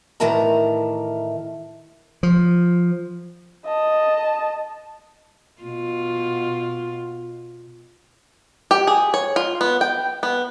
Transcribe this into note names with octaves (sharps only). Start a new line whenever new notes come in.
A2 D#3 E3 A#4 A5 A#5
F3
D#5 A5
B2 F4
G4
G#4
C#5
F4
B3
G5
B3